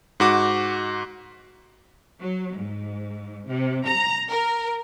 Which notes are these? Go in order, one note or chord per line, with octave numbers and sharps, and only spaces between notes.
G#2 F#4 D6
F#3
G#2
C3
A#5
A#4